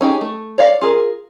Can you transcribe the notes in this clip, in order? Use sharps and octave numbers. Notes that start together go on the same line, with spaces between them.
C#4 D#4 G4 G#4
A3
C#5 D5 F5
F4 G#4 A#4